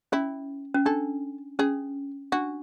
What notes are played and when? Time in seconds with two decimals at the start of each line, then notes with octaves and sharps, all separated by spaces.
0.12 C#4 E4
0.74 C#4
0.86 D4 A4
1.59 C#4 G#4
2.32 D4 F#4